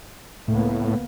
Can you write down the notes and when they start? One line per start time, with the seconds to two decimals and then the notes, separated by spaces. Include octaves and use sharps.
0.48 C#2 A2 A#3 B3